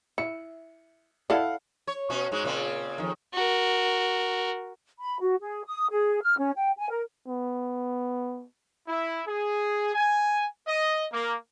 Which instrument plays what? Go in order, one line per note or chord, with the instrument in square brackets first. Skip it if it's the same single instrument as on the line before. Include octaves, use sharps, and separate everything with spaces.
[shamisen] E4 [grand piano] C#7
[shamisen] E4 A4 D5 [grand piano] F5 F#5
[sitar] C#5
B2 C#4 F#4
G#2 G#3 F#4
A#2 C#3 C4
F2 D#3
[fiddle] F#4 A#4
[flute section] B5
F#4
G#4
D#6
G#4
F6
C#4
G5
G#5
A#4
[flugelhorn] B3
[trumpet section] E4
G#4
G#5
D#5
A#3